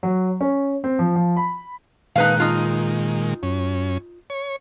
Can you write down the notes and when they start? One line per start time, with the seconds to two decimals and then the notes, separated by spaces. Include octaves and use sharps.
0.03 F#3
0.41 C#4
0.84 C4
0.99 F3
1.16 F3
1.36 B5
2.16 A#2 D#3 G#3 D#4 B4 F5
2.40 D#4 F4
3.43 F#2 C#4
4.30 C#5